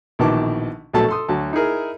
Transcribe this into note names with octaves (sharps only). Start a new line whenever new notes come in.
A#1 B2 D#3 E3 A5 D6
A#1 B2 F#3 A3 A4 A5
A4 C6 D#6
D2 F#3 A5
D#4 E4 G#4 A#4